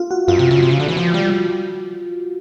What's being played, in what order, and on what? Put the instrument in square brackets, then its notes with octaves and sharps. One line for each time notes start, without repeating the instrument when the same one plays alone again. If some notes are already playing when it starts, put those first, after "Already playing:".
Already playing: [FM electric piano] F4
F#4
[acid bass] F#2 [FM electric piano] F4
[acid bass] C3
C#3
C3
C#3
D3
E3
F3
G3